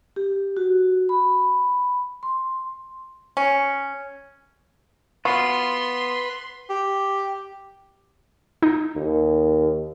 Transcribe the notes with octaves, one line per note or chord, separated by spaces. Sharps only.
G4
F#4
B5
C6
C#4
B3 F4 F#4 B4 C6
G4
D#4
D#2